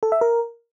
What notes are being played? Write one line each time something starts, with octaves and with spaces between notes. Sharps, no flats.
A4
E5
A#4